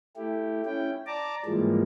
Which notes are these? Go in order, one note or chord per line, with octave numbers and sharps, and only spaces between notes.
A3 E4 G4
C#4 E4 G5
D5 A5 A#5 D6
G#2 E3 F3 G3 G#3 A#3